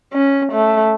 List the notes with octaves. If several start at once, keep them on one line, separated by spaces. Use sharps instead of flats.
C#4
A3